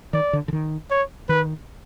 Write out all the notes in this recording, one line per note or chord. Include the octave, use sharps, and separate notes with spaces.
D#3 D5
D3
D3
D#3
C#5
D#3 B4